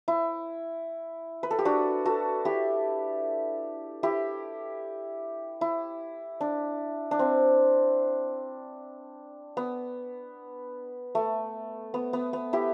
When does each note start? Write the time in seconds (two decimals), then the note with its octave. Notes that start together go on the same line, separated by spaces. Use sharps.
0.08 E4
1.43 B4
1.51 A4
1.59 G4
1.65 D4 F#4
2.05 F#4 A4
2.45 E4 G4
4.03 E4 G4
5.61 E4
6.41 D4
7.11 D4
7.19 C4
9.57 B3
11.15 A3
11.94 B3
12.13 B3
12.33 B3
12.53 E4 G4